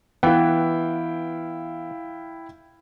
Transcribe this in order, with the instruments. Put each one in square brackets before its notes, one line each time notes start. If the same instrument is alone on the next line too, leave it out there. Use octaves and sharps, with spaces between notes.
[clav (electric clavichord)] E3 B3 [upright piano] E4 F5 G5